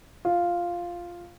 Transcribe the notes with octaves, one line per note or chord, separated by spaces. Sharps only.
F4